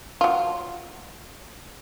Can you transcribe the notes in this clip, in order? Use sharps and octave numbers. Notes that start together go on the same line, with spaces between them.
F#3 F4